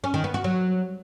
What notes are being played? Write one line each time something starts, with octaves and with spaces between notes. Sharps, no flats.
C#4
D#3
B3
F#4
F#3